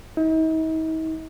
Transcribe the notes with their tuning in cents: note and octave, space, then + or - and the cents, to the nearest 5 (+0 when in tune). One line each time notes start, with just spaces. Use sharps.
D#4 +45